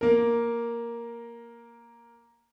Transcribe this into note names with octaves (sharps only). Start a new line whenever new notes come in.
A#3 A#4